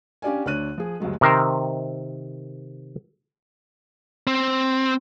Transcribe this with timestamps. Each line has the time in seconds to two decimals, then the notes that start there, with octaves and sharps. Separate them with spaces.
0.22 C#4 D4 G4 D5 F5 G#5
0.45 D2 D4 C#5 F#6 D#7
0.78 F3 G#4
1.00 D2 G2 F#3 G#3
1.21 C3 D#3 A#4 C5
4.27 C4